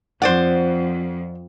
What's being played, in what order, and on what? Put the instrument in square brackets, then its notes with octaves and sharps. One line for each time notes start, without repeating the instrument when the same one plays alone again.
[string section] F2 [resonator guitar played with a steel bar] C5 D5 F#5